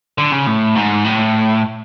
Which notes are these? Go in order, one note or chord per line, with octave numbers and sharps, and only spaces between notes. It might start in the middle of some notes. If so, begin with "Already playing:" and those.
D3
C#3
A2
G#2
A2